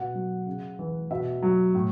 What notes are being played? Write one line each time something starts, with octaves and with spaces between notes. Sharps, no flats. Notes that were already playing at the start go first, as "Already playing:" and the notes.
Already playing: B2 F#5
F#3
C#3
E3
B2 E5
F#3
A2